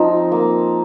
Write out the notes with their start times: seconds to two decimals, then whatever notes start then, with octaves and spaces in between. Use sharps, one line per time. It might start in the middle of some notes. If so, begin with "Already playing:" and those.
Already playing: F3 C4 D#4
0.32 A#3